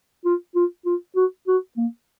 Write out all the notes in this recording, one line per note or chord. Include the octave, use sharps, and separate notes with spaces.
F4
F4
F4
F#4
F#4
A#3